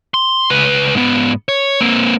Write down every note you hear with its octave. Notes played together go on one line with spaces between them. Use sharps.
C6
C#2 B4
G#2 B3
C#5
A#3 C4